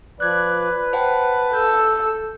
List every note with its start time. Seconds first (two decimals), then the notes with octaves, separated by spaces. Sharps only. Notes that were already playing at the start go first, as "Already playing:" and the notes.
0.20 F3 B4 D5 F#6 G#6
0.93 C5 F#5 G5 A5
1.53 A4 E6 G6